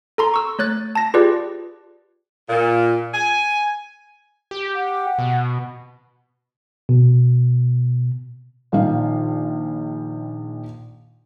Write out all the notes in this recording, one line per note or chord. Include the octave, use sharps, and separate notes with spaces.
A4 A#5 C6
C#6 E6
A3 C#5 F#6 A6
A5 A#6
F4 G4 G#4 B4 D5
A#2
G#5
G4
F#5
B2
B2
A#1 D#3 F5